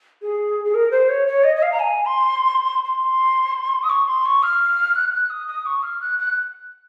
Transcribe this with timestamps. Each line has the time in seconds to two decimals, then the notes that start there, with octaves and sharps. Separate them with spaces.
0.22 G#4
0.65 G#4
0.74 A#4
0.91 C5
1.09 C#5
1.27 C#5
1.44 D#5
1.56 D#5
1.62 F5
1.72 A#5
1.79 G#5
2.06 C6
2.84 C6
3.83 D#6
3.89 C#6
4.07 C6
4.25 C#6
4.43 F6
4.95 F#6
5.13 F#6
5.30 D#6
5.47 D#6
5.66 C#6
5.83 F6
6.01 F#6
6.19 F#6